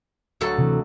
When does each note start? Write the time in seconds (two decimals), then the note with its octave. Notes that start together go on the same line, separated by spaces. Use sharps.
0.41 D2 F#3 A4
0.58 C3 E3